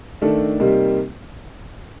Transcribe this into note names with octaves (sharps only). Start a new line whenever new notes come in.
D#3 A3 D4 A4
C3 G3 A#3 D#4